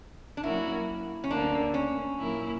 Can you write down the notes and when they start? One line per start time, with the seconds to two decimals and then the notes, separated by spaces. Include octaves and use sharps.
0.37 D4
0.43 F#3 A#3 C#4 E4 F#4 A#4
1.24 C#4
1.31 D2 D3 A#3 D4
1.74 C#4
2.18 A#2 F#3 A#3 E4 A#4